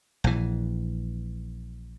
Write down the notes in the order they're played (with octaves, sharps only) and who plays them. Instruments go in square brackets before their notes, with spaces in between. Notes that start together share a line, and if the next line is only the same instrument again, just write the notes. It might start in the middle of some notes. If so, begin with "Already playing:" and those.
[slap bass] A#1 E3